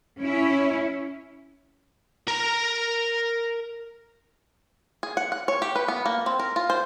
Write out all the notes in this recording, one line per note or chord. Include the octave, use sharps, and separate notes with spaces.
C#4 E4
A#4 A#5
G#4
F#5
F#5
C#5
G4
B4
B3
A#3
C4
A#4
F4
C5